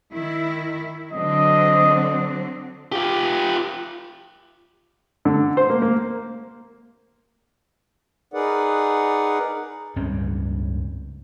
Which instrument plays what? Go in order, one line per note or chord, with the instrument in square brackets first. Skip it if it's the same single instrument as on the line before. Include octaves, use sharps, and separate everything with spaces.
[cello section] D#3 E4
[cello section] D3 F#3 C4 [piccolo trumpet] D#5
[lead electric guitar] F4 G4
[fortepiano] D3
C5
A#3
A#3
[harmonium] D#4 G#4 A#4 B4 D5 F#5
[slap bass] C#2 G2 C4 C#4